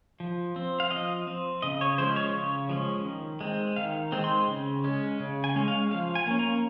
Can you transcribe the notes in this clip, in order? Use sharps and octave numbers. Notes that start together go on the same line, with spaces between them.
F3
C4
F5
F3 D#5
C4
C#3 D#5
C#5
F3 G#3 C#4 C5
C#5
C#3
F3 G#3 C#4
D#3
G#3 C4
D#3 F5
G#3 C4
C6
C#3
G#3 C#4
C#3
G#5
G#3 C#4
F5
F3 F5
G#5
A#3 C#4
A#5